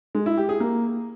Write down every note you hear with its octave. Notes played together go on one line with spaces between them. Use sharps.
G#3
E4
G4
G#4
A#3